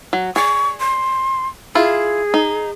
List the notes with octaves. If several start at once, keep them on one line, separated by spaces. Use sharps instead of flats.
F#3
G#4 D5 C#6
C6
E4 F4 G#4
D#4